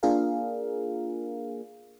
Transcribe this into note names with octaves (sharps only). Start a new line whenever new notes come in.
A#3 D4 F4 G#4 A#4 F5